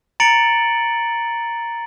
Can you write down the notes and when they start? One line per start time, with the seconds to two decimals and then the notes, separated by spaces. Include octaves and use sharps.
0.20 A#5 A6 C#7 D7 F#7